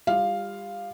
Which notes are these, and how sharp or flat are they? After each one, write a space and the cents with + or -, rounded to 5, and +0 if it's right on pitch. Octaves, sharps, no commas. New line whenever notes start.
G3 +30 F4 +0 F5 +0